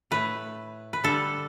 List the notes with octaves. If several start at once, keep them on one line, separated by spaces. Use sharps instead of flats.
A2 A3 B4
B4
D3 G3 A4